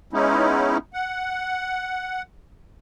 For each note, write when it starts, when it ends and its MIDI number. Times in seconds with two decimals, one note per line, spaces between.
0.13 0.77 56
0.13 0.77 59
0.13 0.77 61
0.13 0.77 63
0.13 0.77 64
0.93 2.22 78